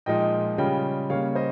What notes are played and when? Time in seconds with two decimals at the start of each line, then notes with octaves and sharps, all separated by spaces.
0.06 A#2 F3 G#3 D#4 D#5 G5
0.58 C#3 G3 C#4 F4 D#5 G5
1.10 C#3 G3 A#3 C#5 F5
1.35 C5 D#5